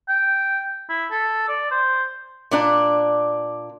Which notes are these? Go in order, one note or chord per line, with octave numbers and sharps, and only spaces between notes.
G5
E4
A4
D5
C5
A#2 D4 D5